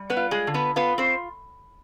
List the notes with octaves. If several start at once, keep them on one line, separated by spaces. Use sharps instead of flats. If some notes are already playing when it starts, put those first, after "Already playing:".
Already playing: G3
B3 B4
F4
G#3 G#4
D3
B3 B4
B3 F4 B4
C4 C5